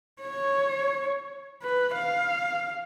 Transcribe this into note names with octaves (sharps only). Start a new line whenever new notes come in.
C#5
B4
F5